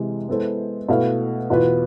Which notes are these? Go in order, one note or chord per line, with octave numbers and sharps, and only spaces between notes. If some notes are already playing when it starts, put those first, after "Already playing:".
Already playing: C3 E3 G#3
G#3 B3 E4 A4 C5
B2 A3 E4 B4 F5
E2 B2 B3 F4 B4